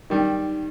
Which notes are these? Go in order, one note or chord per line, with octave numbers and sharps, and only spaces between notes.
D#3 G3